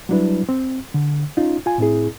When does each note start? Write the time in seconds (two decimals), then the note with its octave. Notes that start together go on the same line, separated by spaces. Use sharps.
0.09 F#3 G3 D4 E4 B4
0.49 C4
0.94 D3
1.37 C#4 D#4 F4
1.66 F4 G#5
1.78 A2 C4 E4 G#4